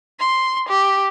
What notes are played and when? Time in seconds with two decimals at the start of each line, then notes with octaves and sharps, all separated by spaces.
0.20 C6
0.69 G4